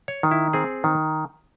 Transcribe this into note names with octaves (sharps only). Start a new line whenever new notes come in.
C#5
D#3
E4
C4 G#4
D#3